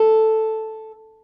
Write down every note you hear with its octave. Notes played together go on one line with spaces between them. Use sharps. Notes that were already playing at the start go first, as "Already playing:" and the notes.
Already playing: A4